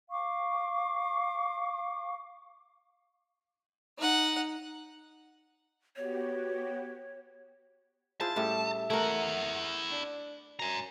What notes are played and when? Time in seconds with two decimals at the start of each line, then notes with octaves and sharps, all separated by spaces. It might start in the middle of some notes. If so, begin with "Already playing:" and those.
0.10 F5 C#6 D6
3.98 D#4 F#5
5.96 B3 F#4 G4 C#5
8.20 E4 F4 G#4 C5 A5
8.36 A2 G3 C#4 E5
8.90 A3 E4 A#4 F#5
9.90 D4
10.59 F#2 G#5 A#5